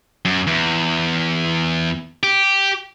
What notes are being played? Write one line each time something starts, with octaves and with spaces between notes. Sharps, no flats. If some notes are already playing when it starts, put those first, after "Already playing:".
F#2
E2
G4